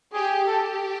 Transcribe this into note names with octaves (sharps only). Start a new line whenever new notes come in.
G4 G#4
G4 A4